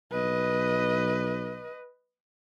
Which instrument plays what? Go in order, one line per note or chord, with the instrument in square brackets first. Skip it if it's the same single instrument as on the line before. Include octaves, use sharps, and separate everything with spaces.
[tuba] B1 [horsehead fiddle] B4 D#5